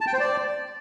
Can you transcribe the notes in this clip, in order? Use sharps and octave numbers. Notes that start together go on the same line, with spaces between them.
A5
G5
C5
D5